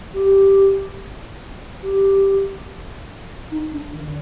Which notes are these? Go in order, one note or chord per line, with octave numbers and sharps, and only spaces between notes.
G4
G4
D#4
D4
D#3
D3